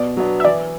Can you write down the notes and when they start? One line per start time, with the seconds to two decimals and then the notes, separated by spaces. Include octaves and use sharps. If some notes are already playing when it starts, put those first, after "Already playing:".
Already playing: B2 D5
0.17 F#3 B3 D4
0.40 E5
0.44 E3 D5